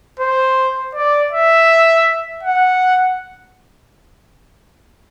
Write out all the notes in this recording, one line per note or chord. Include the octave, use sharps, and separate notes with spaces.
C5
D5
E5
F#5